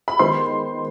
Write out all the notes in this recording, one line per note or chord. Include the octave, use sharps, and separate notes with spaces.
B5
D#3 G#3 B3 C5 C6